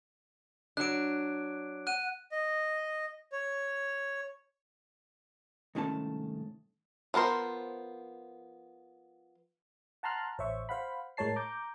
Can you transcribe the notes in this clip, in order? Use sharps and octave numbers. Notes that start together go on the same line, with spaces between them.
F#3 D4 F#6 D7
F#5 F#6 D#7
D#5
C#5
C2 G#2 D#3 A3 C#4 A5
F3 B3 A#4 C5
F#5 A5 A#5 C6 F6 F#6
A1 C5 C#5 E5 C#6
C5 F5 F#5 B5
A2 G#3 A#4 C#5 A5 C7
A#5 D6 G6